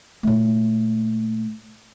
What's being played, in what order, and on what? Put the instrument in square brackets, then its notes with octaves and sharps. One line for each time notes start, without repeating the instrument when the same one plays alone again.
[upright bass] A#2 A3